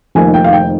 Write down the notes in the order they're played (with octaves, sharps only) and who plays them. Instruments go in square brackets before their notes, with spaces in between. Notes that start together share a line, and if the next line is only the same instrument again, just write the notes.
[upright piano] F1 F2 D#3 A#3 G#5
G5
F5
G5